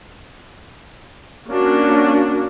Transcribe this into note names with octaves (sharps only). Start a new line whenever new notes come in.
A#3 C#4 D4 F#4